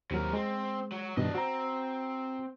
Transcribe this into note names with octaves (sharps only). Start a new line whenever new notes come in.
D#2 C3 F#3 A#4
G#3 C4
F#3
G2 B2 D#3 D4 D#5
C4 F#4 A#5